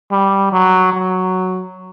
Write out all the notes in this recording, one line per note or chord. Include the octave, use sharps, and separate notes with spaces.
G3
F#3
F#3